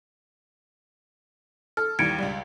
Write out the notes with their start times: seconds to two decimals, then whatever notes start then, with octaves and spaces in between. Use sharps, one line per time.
1.77 A4 F6
1.99 D#2 E3 G3 G#6 C#7 D7
2.18 C#2 G3